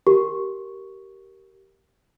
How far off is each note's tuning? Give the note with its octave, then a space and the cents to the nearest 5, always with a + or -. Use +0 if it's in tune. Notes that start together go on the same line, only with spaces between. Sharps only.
G4 -20 A#4 +0 C#6 +0